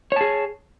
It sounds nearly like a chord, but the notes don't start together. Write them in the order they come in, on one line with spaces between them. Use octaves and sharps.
C#5 A5 G#4